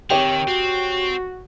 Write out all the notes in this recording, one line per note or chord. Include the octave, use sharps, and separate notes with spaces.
D#2 D#3 C4 G4 C#5 G5
C4 F#4